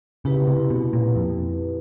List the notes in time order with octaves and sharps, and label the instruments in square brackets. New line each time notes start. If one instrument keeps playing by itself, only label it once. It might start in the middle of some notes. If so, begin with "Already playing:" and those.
[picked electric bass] C#3 [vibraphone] E4 G4 B4
[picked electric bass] C3
B2
A#2
F2